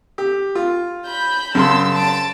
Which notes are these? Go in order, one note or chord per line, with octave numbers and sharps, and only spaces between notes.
G4
F4
B5 G6
F#2 C#3 A5 C6 E6
A5 D7